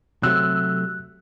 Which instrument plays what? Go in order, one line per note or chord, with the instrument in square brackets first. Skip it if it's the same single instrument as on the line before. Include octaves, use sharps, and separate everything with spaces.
[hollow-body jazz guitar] C3 F#3 A3 [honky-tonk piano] E6 [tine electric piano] F#6